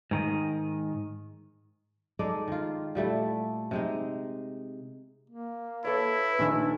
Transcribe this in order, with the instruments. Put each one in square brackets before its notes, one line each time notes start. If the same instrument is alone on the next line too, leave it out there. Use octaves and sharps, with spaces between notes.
[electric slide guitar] G#2 D#3 D#5
[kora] G#3 D#4 A4 D5
D#3 F4
A#2 G3 A3 E4
C3 G#3 D#4
[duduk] A#3
[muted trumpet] E4 [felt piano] A4 C#5 [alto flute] B4
[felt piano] A#1 D#3 E6 [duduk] A4